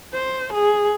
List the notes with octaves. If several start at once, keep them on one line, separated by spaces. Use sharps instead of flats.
C5
G#4